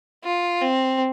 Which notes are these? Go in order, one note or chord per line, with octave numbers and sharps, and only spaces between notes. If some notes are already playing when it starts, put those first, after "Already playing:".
F4
C4